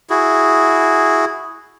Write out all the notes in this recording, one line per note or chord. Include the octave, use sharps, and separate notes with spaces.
E4 F#4 G#4